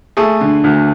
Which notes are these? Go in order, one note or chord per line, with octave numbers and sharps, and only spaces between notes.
A3 G#4
D3
D2